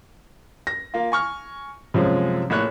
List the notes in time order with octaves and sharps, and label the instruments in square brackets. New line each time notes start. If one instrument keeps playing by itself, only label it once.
[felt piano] A#6
[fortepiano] A#3 F4
G#5 C#6 F6
[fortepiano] F#2 G#3 [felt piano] C3 F3 C#4
[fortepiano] A#1 C#5 F#6 [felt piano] A2